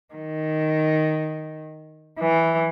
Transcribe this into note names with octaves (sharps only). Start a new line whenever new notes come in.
D#3
E3